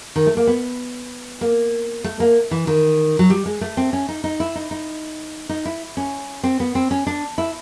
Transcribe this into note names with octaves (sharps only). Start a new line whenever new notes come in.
D#3
A3
A#3
B3
A#3
A3
A#3
E3
D#3
F#3
G3
G#3
A3
C4
C#4
D#4
D#4
E4
D#4
D#4
D#4
E4
C#4
C4
B3
C4
C#4
D4
E4